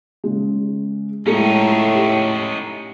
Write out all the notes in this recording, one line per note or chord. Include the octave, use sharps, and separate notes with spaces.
C#3 G#3
A2 G#3 C#4 D#4 F4 A4
G4